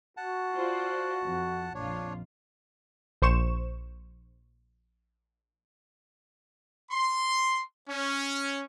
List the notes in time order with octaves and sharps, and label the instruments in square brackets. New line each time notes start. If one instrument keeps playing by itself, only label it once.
[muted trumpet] F#4 [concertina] F#5 A5
[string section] F4 C5 D5
F2
[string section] A#1 F2 F4 [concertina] D4 C#5
[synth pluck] A#1 C5 C#6 E7
[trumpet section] C6
C#4